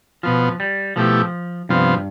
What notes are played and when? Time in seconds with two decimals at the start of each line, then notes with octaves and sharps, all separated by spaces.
0.23 B2 F3 B3 F4
0.60 G3
0.96 B2 F3 A3 E4 G4
1.69 G2 C3 F3 B3 F4